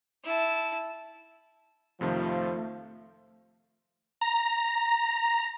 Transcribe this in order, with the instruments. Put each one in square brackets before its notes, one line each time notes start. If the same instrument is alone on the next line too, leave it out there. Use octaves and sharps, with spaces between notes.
[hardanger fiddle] E4 A5
[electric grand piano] F2 C3 D#3 [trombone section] F3 [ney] A3
[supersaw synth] A#5